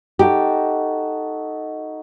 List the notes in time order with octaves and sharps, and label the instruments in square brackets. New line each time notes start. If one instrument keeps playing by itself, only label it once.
[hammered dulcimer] D#4 F#4 A4 [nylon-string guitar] G4